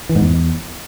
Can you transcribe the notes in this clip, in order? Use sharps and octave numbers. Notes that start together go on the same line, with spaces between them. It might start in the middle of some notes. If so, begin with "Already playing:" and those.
E3
G#2
E2